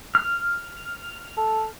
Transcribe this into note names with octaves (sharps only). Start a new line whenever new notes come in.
F6
A4